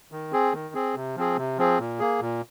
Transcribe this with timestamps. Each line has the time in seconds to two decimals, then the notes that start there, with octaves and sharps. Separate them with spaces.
0.12 D#3
0.32 C4 G#4
0.53 D#3
0.75 C4 G#4
0.95 C3
1.16 F3 C4 G#4
1.37 C3
1.58 F3 C4 G#4
1.79 A#2
2.00 A#3 G#4
2.21 A#2